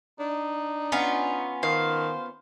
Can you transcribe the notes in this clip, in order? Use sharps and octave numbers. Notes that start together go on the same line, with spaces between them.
D4 D#4
B3 C#4 F4
D#3 C5 F5